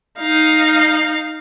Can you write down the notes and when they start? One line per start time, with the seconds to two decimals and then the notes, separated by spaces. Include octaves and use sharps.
0.19 D#4 F5